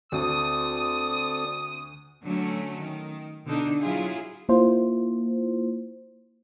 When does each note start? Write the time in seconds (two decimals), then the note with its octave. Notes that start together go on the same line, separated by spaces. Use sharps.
0.12 D2 C4 A4 D5 D#6
2.25 D3 F#3 A3 C#4
2.79 D#3
3.46 B2 D3 D4 D#4 A4
3.81 F#3 E4 F4 G#4
4.49 A#3 E4 F4 C5